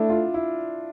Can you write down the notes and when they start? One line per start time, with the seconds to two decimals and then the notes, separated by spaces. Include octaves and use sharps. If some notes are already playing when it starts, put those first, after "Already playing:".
Already playing: A3 D4 E4
0.10 F4
0.34 E4